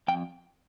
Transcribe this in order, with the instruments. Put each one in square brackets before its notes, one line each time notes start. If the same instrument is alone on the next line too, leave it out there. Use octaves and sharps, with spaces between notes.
[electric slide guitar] F2 G5